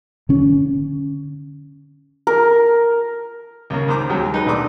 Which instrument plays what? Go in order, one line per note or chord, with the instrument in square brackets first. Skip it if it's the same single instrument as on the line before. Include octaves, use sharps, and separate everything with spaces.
[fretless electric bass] D3 C#4
[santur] A#4
[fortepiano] C#2 C#3 A#3
D#3 C5 A#5 D6
D#2 F#3 G#3 G5
D#4 B4
B1 A3 D4 C6 D6 D#6